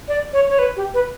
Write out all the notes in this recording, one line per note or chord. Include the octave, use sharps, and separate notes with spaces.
D5
C#5
C#5
B4
G4
B4